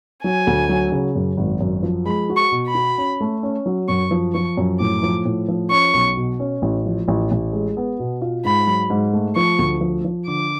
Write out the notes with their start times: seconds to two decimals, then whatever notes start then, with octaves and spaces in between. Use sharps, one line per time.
0.24 F#3 G#5
0.47 D2
0.69 F#3
0.92 C#3
1.15 F#2
1.37 G#1
1.61 F#2
1.83 F3
2.05 G#3 B5
2.29 F#4
2.36 C#6
2.52 B2
2.67 B5
2.75 F#4
2.98 C#4
3.21 A3
3.43 C#4
3.66 F#3
3.88 F#2 C#6
4.11 F3
4.34 F3 C#6
4.57 F#2
4.80 A2 D6
5.03 F3
5.25 A2
5.48 F3
5.71 C#4 C#6
5.94 B1
6.17 B2
6.40 C#4
6.62 A1
6.86 F3
7.08 A1
7.31 A1
7.53 G#3
7.77 B3
8.00 B2
8.22 F4
8.45 G#2 B5
8.67 F#3
8.90 G#2
9.13 A3
9.36 F3 C#6
9.58 D2
9.81 F3
10.05 F3
10.27 D3 D6